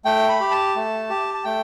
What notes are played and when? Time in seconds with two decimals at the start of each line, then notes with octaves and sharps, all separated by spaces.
0.05 A3 G5
0.29 B5
0.40 G4
0.51 A5
0.75 A3
1.10 G4
1.34 A5
1.44 A3 G5